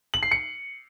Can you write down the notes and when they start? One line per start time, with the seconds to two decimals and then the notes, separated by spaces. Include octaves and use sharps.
0.14 F#7
0.23 C7
0.31 C#7